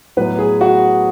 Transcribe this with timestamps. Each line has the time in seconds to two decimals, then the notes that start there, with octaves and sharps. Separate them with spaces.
0.17 A2 F#3 B3 B4
0.39 G#4
0.61 F#4